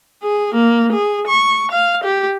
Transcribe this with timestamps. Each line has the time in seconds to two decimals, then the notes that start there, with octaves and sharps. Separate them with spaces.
0.23 G#4
0.55 A#3
0.93 G#4
1.28 C#6
1.71 F5
2.04 G4